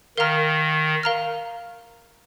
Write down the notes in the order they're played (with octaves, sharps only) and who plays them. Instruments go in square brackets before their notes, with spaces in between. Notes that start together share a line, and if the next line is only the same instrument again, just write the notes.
[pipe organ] D#3 [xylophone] A#4 F5 A#5 F6
[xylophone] A#4 F5 A#5 F6